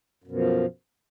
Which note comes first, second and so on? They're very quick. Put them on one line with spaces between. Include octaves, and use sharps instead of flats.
F#2 B2 F3